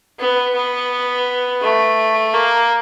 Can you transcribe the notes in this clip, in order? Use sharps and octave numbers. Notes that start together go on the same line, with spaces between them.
B3
B3
A3
A#3